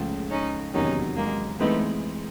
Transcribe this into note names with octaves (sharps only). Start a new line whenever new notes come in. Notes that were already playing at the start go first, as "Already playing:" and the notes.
Already playing: C#2 C#3 F3 A3
C#4 D#4
E2 C3 D#3 F#3 A#3 C#4 D#4
G#3 A#3
E3 G#3 A3 B3 C4 D#4